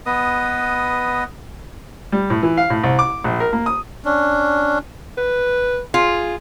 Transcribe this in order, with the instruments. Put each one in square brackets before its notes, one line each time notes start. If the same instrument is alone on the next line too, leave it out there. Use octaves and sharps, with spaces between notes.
[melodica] B3 B4 D#5 D#6
[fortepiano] G3
A2
E3
F5
A2
C2
D6
A#1
A#4
A#3
D#6
[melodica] C#4 D4
[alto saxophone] B4
[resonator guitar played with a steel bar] F4 [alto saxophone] G#4